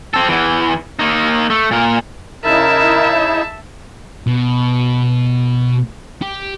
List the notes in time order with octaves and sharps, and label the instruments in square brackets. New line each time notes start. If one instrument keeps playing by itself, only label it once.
[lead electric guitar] C4 A4
E2 E3
A#3 D#4
A3
A#2 A#4
[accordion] C#3 D#4 E4 [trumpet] A#4 [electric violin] E5 A5
[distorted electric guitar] B2
G4